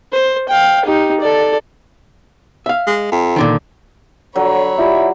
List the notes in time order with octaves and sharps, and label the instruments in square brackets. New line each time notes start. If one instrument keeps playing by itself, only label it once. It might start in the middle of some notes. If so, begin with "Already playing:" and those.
[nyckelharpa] C5
F5 G5
D#4 G4
A4 D5
[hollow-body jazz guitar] E5 F5
[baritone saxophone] G#3
F2
[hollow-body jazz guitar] A#2 D3 D#3
[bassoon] D3 [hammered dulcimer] F#3 [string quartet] C#5 B5
[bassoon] E4 [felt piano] F4 G4 D5